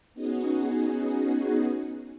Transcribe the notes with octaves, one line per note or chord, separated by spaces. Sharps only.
B3 C#4 D#4 F#4 G#4